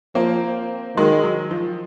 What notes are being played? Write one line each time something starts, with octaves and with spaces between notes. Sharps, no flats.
F3 A#3 C4
D#3 F#3 G#3
F#3
F3